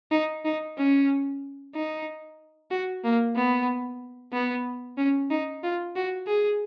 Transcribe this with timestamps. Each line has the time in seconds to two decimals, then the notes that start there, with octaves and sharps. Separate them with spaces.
0.12 D#4
0.45 D#4
0.78 C#4
1.75 D#4
2.71 F#4
3.04 A#3
3.36 B3
4.33 B3
4.98 C#4
5.31 D#4
5.64 F4
5.96 F#4
6.27 G#4